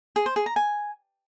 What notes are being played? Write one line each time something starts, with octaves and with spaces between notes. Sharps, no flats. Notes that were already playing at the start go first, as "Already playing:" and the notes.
G#4
C5
G#4
A#5
G#5